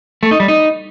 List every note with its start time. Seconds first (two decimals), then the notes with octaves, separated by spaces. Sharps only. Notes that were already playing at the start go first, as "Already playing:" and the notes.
0.23 A3
0.31 D#4
0.40 G3
0.48 D#4